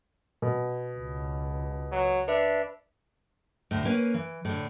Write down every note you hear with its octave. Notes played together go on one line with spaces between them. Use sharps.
B2
C#2
F#3
D4 B4 E5
D2 A2
A#3 C#4 B4 G#5
E3
A2 D3